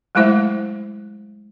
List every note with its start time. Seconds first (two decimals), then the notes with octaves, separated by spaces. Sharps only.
0.15 F#3 G#3 A3 E4 C5 E5